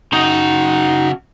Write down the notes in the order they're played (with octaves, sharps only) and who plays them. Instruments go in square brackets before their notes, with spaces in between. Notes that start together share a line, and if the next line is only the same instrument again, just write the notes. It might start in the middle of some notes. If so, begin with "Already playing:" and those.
[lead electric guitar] C#3 F#4 [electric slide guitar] D#4 A#5